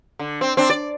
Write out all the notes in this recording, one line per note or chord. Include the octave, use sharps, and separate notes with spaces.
D3
C4
C4 D4
D5